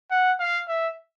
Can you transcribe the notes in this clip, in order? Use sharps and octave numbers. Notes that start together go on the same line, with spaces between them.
F#5
F5
E5